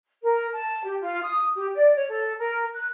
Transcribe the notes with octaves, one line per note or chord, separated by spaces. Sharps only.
A#4
A5
G4
F4
D#6
G4
D5
C#5
A4
A#4
F#6